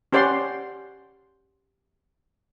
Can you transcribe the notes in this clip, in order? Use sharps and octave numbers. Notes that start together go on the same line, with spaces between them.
C#4 G4 C5 D5 F#5 C6